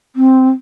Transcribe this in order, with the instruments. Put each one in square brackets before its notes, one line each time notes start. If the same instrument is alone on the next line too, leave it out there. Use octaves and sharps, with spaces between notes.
[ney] C4